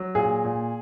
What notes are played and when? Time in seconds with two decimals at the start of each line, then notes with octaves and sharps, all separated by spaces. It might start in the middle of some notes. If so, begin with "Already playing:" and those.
Already playing: F#3
0.15 A#2 G#4
0.44 A#2